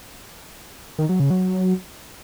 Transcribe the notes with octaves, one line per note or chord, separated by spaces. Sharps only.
D#3
F#3
C#3
F#3